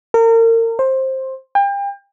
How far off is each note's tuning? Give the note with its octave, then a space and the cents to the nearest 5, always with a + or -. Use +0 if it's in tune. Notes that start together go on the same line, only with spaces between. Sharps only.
A#4 -35
C5 +15
G5 +35